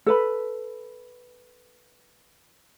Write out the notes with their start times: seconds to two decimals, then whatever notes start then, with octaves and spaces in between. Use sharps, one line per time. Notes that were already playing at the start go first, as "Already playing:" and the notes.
0.06 A4 B4 B5